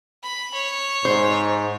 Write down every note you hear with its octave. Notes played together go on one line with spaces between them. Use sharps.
B5
C#5
G#2 C5